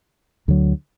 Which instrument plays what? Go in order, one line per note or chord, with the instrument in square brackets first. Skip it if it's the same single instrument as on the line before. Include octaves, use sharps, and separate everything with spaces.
[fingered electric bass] D2 D3 F#3